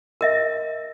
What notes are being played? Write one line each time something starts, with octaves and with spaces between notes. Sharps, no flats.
A#4 D#5 E5